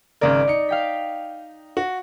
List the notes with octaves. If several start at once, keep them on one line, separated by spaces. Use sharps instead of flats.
G#1 C#3 A#4 D5
D#4 C#7
F5 G5 B6
F#4